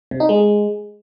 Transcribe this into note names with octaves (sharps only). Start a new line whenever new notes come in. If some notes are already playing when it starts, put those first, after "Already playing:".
C3
D#4
G#3